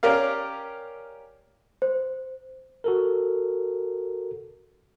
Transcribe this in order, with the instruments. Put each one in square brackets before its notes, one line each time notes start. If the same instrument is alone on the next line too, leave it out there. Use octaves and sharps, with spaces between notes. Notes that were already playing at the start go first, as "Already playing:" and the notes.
[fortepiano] C#4 G4 A#4 D5 F5
[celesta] C5
[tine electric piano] F#4 A4 A#4